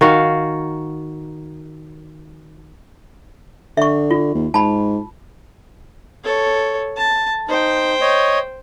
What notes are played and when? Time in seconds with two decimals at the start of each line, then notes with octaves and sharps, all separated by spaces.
0.01 D#3 F#4 F5
3.77 D3 E5 C#6
4.11 F4
4.35 D#2
4.54 G#2 A5 B5
6.24 A4 C#5
6.97 A5
7.49 D#4 C5 G5
8.01 C#5 D#5